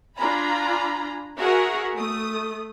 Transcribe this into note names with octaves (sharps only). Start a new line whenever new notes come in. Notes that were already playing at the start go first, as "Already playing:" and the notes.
D4 F4 G#5 A#5 B5
F#4 G#4 A#4 E5 F#5
A3 D#6